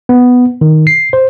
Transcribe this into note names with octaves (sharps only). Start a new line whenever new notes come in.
B3
D#3
C7
C5